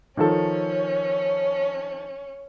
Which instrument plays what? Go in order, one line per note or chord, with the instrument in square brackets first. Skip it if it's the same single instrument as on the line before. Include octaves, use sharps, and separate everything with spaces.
[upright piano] D#3 F3 A4 [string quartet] C#4